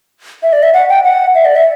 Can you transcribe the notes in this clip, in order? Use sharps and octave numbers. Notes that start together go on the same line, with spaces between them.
E5
D5
E5
F#5
G5
F#5
E5
D5
E5